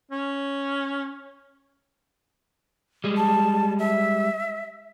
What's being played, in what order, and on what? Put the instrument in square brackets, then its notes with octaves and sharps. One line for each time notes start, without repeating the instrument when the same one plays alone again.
[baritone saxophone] C#4
[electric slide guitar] G3 G#3
[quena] A5
E5